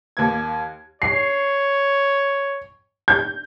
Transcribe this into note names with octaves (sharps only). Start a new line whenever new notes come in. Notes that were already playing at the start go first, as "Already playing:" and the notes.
D#2 A#3 G#6
C#5 C7
G6